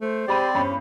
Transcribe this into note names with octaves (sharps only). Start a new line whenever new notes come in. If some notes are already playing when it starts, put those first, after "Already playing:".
A3 C5
G#3 C4 G4 D5 B5 D#7
E2 G2 C#4 B5